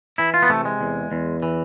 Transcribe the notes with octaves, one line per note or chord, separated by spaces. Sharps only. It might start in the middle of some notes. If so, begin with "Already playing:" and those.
E3 E4
F4
B3
C3 A3
G#3
E2
E2
E3